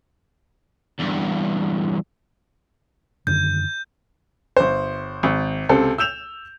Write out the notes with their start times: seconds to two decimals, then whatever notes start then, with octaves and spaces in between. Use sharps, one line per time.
0.99 E2 G2
3.27 F#2 D3 D#3 G6
4.57 G1 C5
5.23 G#1
5.69 C#2 C3 A4 C5
5.98 E6 G6 E7 F7